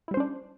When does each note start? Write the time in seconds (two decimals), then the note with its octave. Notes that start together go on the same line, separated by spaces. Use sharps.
0.08 E4
0.11 G3
0.14 C5
0.17 C#4
0.20 D4